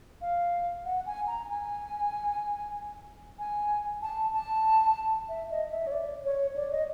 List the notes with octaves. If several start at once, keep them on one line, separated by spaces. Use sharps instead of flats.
F5
F#5
G#5
A#5
G#5
G#5
A5
A5
E5
D#5
E5
C#5
D5
C#5
D5
D#5